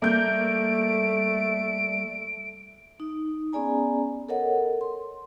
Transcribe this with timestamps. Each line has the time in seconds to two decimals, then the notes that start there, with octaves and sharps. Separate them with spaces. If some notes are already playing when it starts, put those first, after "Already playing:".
0.02 G3 A3 A#3 G6 D7
3.00 D#4
3.53 B3 C#4 G#4 D5 G#5 A#5
4.29 A4 A#4 C#5 D#5 F#5
4.81 C6